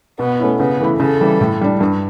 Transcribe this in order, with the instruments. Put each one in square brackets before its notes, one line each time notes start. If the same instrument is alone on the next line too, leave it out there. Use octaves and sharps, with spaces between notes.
[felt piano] B2 [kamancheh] B3
[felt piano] A3 C#4 E4
[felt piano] C#3 [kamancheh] B3
[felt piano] E3 A3 E4
[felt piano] C#3 [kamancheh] A4
[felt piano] E3 G3
A2
G3 D4
G2